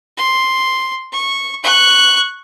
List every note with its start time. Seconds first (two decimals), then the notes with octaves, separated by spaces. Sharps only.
0.17 C6
1.13 C#6
1.63 C#6 F#6